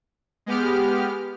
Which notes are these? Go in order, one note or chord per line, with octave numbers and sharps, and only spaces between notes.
G#3 B3 G4 F6